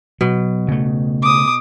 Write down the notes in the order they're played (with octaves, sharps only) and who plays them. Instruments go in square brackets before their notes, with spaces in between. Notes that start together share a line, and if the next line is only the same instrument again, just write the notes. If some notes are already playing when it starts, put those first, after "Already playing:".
[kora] B2 [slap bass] F#3
[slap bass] C#3 A3
[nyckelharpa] D6 D#6